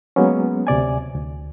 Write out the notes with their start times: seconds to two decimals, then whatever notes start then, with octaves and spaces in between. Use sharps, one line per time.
0.16 F#3 G#3 A#3 B3 C#4
0.67 D2 C3 D5 G#5
1.14 D2